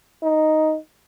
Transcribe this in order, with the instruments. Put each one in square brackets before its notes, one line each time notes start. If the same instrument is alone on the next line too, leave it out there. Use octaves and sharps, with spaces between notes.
[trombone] D#4